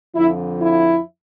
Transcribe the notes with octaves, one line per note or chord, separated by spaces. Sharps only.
F2 D3 F3 E4
E4